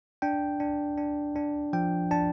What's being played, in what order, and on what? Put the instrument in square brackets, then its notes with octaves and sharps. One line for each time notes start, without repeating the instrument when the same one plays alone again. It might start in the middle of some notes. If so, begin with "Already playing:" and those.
[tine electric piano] D4 G5
D4
D4
D4
F3 G5
D4 A5